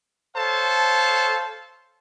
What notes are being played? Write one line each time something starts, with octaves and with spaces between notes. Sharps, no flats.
A4 C5 C#5 F5 A5